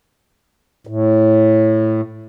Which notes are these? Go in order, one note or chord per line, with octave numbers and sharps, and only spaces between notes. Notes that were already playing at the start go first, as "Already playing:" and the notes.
A2